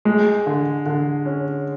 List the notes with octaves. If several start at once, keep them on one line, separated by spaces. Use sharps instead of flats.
G#3
D3
D3
C#4